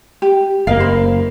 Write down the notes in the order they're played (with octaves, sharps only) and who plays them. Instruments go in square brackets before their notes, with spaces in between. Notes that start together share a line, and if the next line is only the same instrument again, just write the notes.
[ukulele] G4
[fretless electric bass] F#1 A#3 [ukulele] A#4 D#5 F5
[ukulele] C5 B5